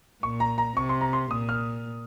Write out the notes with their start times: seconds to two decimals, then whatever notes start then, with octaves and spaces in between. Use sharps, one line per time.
0.23 A#2 C#6
0.40 A#5
0.58 A#5
0.77 C3 C#6
0.89 C6
1.01 A#5
1.13 C6
1.31 A#2 D#6
1.49 F6